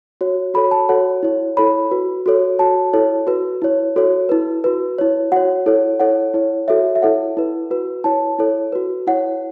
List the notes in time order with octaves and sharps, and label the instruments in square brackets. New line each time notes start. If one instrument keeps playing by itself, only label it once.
[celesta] F#4 C#5
F#4 A4 C#5 B5
A5
F#4 A4 C#5 F#5
E4 C#5
E4 A4 C#5 B5
F#4 B4
F#4 A4 C#5
F#4 C#5 A5
E4 A4 C#5
F#4 B4
E4 C#5
F#4 A4 C#5
E4 B4
F#4 B4
E4 C#5
F#4 C#5 F#5
E4 A4 C#5
E4 A4 C#5 F#5
E4 C#5
F#4 A4 C#5 E5
E5
E4 A4 C#5 F#5
E4 B4
F#4 B4
E4 C#5 A5
E4 A4 C#5
F#4 B4
E4 C#5 F#5